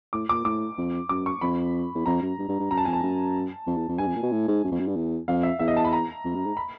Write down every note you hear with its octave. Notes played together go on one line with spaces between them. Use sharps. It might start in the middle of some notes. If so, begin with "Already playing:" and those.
A2 D6
A#2 D6
A2 D6
F2
F#2 D6
C#6
F2 B5
E2
F2 A#5
F#2
G2
G2
G2
F#2 A#5
A5
F2 G#5
A5
F#2
F2
E2
F2
G2 G#5
F2
A#2
B2
A2
G#2
F#2
F2
F#2
G2
E2
F2 F5
E5
E2 E5
D#5
A5
B5
A#5
F2
F#2
G#2
B5